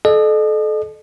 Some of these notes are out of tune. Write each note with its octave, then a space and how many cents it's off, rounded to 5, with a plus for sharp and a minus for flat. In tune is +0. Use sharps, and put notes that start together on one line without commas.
A4 -30 D#5 -40